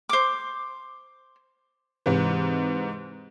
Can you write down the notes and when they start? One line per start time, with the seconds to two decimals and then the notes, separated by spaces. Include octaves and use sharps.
0.09 C5 D6
2.06 G#2 C3 E3